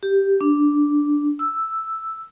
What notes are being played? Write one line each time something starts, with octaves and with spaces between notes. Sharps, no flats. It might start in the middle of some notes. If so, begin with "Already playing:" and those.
G4
D4
E6